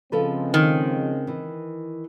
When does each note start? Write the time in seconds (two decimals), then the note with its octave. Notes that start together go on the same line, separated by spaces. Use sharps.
0.12 C#3 F3 G#3 C4 A4 B4
0.54 D#3
1.27 E3